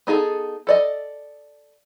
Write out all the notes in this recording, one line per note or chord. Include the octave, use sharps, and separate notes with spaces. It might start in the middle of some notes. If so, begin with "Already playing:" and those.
B3 D#4 G#4 A4
A4 D5 D#5